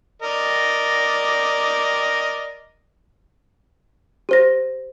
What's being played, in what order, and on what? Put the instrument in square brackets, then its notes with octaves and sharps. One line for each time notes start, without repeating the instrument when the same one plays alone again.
[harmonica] A#4 D5 D#5
[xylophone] G4 C5 A#6